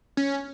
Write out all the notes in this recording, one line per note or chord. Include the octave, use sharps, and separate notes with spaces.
C#4